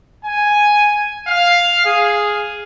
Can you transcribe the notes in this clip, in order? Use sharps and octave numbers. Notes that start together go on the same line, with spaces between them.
G#5
F5
G#4